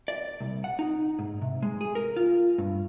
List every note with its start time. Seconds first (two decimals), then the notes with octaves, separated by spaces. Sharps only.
0.08 D5
0.41 C2
0.64 F#5
0.79 D#4
1.19 G#2
1.42 C3
1.63 G#3
1.81 G#4
1.95 A#4
2.16 F4
2.58 G2